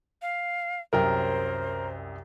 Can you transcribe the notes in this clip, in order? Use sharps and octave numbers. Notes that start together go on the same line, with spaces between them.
F5
C2 F#2 A#4 C5 G5